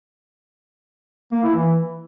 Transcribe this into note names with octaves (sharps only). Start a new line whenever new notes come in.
A#3
E4
E3